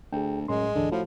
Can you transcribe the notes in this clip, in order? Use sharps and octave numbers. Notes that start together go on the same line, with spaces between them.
D2 G#4 G5
F#2 A2 G#3 C6
D2 G#2 D3 E3
A2 F3 F#4